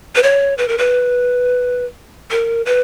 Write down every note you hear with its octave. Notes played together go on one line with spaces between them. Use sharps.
B4
C#5
B4
A#4
B4
A#4
B4